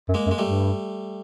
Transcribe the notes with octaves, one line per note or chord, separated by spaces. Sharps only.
F#2
G#3 A#3
F#2
G#3
G3 A3
G2